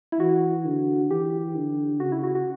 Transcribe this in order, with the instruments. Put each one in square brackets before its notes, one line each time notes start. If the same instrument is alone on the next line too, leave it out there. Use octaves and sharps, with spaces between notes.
[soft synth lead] E4
[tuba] E3 [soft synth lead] F#4
[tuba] D3
[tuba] E3 [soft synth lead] G4
[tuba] D3
[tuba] C#3 [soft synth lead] F#4
[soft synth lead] E4
F#4
F#4